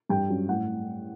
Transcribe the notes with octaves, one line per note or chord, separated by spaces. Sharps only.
G2 G5
F#3 C#4
A2 F#5